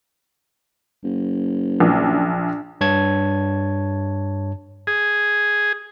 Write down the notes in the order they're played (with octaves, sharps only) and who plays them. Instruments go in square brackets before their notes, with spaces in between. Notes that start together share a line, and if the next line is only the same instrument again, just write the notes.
[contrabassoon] F#1
[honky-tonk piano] A#1
[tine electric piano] G2 C#5 A5 G#6
[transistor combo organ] G#4